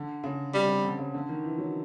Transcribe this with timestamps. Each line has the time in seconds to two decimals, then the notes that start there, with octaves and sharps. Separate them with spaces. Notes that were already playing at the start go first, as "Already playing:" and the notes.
Already playing: D3
0.24 C#3
0.54 C3 G3
0.69 C3
0.84 D3
0.99 C#3
1.14 D3
1.29 D#3
1.44 E3
1.58 F#3